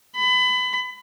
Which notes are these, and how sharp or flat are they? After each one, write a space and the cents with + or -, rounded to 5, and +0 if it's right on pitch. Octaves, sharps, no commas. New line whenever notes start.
B5 +25